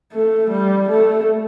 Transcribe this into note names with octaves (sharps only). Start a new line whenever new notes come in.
A3
G3
A3